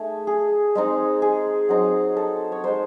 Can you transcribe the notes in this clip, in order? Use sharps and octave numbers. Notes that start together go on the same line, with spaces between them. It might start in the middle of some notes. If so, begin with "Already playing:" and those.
Already playing: A3 D#4 G#4
G#4
G#3 C4 D#4
G#4
F#3 C4 D#4
A4
C#5
G#3 D#4 C5